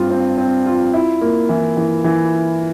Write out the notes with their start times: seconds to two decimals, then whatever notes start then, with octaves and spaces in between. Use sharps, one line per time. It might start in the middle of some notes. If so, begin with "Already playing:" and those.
Already playing: G2 C4 F4
0.10 C4
0.37 C4
0.66 F4
0.94 E4
1.21 A#3
1.49 E3
1.77 E3
2.04 E3